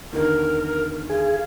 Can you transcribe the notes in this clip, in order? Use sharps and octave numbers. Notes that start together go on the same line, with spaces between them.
E2 D3 D#3 A#4
G#4 F5